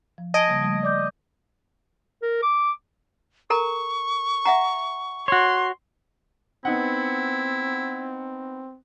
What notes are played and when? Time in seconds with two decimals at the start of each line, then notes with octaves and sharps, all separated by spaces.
0.18 F3
0.34 D#5 G#5 A5 G#6 D7
0.47 C#3 G3 A#3
0.60 F3 G3 A3
0.83 D5 D6 G6
2.22 A#4
2.43 D6
3.50 A4 A#4 A#5 C#6
4.45 E5 F#5 A#5
5.28 F#4 C#5 C6
6.65 B3 C4 D#4 E4 F#5